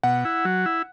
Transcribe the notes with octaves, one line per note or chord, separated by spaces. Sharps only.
B2 F#5
E4
F#3
E4